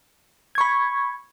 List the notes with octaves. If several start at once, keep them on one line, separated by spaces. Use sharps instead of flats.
B5 C#6 G#6